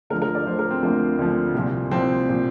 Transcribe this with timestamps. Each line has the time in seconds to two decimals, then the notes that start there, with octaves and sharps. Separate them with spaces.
0.10 D2 D3 F3 A#4
0.22 A#4
0.35 D5
0.46 D2 D3 F3 C5
0.59 A#4
0.71 C4
0.83 D2 D3 F3 A#3
1.18 D2 D3 F3
1.54 C2 A#2 F3
1.91 C2 A#2 F3 C4
2.29 A#2 F3